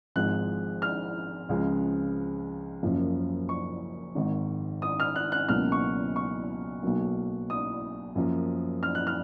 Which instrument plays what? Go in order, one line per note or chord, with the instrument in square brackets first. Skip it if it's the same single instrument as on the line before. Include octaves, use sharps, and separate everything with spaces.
[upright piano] G#1 G#2 F3 G#3 F#6
F6
C#2 C#3 F3 G#3
F#1 F#2 C#3 F3 A#3
C#6
G#1 G#2 D#3
D#6
F6
F#6
F#6
C#2 B2 F#3 A#3 F6
C#6
C#6
B1 B2 F#3 A#3
D#6
F#2 F3 A#3
F6
F#6
F6